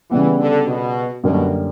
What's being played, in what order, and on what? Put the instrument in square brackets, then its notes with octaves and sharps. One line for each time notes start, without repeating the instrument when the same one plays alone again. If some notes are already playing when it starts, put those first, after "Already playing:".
[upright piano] C#3 G3 B3 [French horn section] E3
[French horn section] D3
B2
[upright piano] F#2 D3 G3 A#3 [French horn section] B2